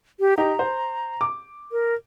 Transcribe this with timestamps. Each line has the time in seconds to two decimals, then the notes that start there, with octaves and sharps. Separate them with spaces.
0.20 G4
0.38 D#4 G4 A#5
0.59 C5
1.21 D6
1.72 A#4